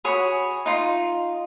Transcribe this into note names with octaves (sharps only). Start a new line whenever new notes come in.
F#4 G#4 C#5 B5
D#4 F4